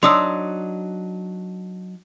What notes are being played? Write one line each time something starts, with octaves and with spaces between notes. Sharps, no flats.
F#3 D4 D#4 C6 D#6 E6